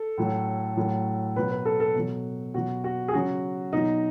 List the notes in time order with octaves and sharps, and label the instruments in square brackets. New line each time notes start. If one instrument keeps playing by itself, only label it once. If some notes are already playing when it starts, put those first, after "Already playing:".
Already playing: [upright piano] A4
A2 F#3
A2 F#3
B2 F#3 B4
B4
A4
A4
B2 F#3
B2 F#3 F#4
F#4
G#4
C#3 F#3 F#4
B2 F#3 D#4